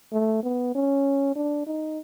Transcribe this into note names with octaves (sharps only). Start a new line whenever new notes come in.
A3
B3
C#4
D4
D#4